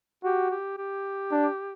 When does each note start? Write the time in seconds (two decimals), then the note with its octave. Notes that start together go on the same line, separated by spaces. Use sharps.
0.24 F#4 G4
0.51 G4
0.77 G4
1.31 D4